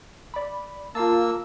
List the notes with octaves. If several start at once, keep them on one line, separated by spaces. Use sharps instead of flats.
D5 B5
A#3 F4 F5 A5 E6